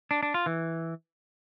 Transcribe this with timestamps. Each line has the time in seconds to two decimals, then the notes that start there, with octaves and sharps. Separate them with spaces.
0.11 D4
0.23 D4
0.34 F4
0.46 E3